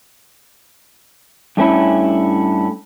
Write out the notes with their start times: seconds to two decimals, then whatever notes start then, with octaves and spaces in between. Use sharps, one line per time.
1.57 G2 A3 C#4 E4